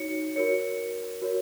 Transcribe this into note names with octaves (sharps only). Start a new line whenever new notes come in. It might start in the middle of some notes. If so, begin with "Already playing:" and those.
Already playing: D#4 F#4 C#5 C#7
F#4 A#4 C#5 C#7
F#4 A#4 C#5